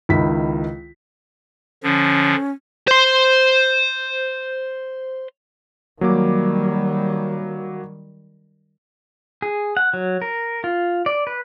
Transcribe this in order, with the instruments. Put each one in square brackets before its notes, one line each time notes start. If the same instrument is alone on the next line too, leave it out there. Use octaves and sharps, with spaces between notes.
[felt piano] C#2 D#3 E4 B6
[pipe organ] D3 F3 [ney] C#4
[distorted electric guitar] C5 C6
[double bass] D#3 G3 [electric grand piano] F#3 A#3 D6
[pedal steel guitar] G#4
F#5
F#3
A#4
F4
D5
B4